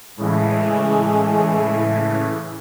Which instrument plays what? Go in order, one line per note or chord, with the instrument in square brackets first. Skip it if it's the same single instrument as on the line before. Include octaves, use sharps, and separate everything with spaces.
[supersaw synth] A2 C#3 E3 [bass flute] G#3 [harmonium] A3